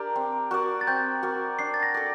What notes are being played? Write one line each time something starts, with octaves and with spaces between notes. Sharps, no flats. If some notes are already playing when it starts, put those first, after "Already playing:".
Already playing: D4 G4 A#4 D5 A#5
C4
F#4 A#4 D5
A6
C4 G6
F#4 A#4 D5
D4 C7
A6
A#6
A4 D5